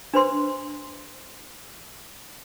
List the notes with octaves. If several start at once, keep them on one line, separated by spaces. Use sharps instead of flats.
D4 B4 C5 C6